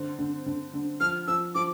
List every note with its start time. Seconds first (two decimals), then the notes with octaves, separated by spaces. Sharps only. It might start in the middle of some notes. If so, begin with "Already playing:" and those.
Already playing: D3 C4
0.19 D3
0.46 D3
0.74 D3
1.00 F3 F6
1.27 F3 E6
1.55 F3 D6